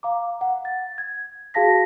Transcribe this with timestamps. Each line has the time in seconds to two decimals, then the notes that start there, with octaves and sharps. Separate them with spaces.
0.03 F5 A#5 D6
0.41 F#5
0.65 A6
0.98 G#6
1.54 F#4 G#4 F5 A5 A#6 B6